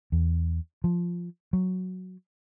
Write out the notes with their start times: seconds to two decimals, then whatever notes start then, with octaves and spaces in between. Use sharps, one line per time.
0.12 E2
0.84 F3
1.53 F#3